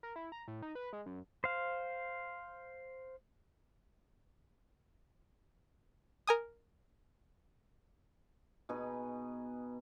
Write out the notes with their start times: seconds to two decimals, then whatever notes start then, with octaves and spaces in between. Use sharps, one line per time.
0.03 A#4
0.16 E4
0.32 A#5
0.48 A2
0.62 D#4
0.75 B4
0.93 G#3
1.06 F#2
1.44 C5 F5
6.27 A#4 G#5 D#6
8.69 B2 D#4 G#4 B4